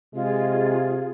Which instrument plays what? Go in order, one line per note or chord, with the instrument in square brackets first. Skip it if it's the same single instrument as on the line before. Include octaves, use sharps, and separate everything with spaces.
[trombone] C3 [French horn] G#3 [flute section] F4 G#4